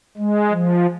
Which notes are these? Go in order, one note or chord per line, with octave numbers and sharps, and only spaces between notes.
G#3
F3